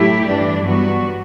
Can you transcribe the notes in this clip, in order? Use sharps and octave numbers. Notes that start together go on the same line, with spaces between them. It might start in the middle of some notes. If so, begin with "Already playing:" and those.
Already playing: A2 F#3 A3 E4 G4
G2 E3 G3 D4
G2 F#3 B3 F#4